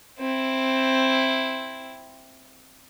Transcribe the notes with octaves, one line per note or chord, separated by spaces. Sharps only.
C4 E4